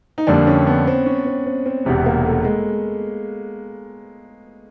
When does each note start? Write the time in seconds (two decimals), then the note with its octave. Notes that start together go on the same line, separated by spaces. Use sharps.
0.18 D#4
0.27 F2 D3 G3 A#3 D4
0.47 C#4
0.67 B3
0.87 C4
1.06 C#4
1.26 C4
1.46 C4
1.66 C4
1.85 E1 E2 C3 B3
2.06 A#3
2.26 A3
2.45 G#3